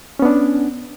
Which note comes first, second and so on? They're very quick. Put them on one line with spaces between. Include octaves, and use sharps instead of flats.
C#4 B3 D4